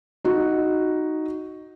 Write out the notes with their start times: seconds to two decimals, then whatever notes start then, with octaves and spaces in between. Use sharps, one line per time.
0.24 D#4 F#4